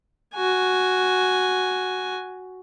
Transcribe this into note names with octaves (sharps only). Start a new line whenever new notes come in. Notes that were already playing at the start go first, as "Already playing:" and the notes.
F#4 G#5